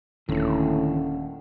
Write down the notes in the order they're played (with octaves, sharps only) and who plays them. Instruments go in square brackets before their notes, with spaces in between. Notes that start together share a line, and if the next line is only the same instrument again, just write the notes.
[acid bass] D#1 [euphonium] A2 [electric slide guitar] D3 D#3 [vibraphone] C#4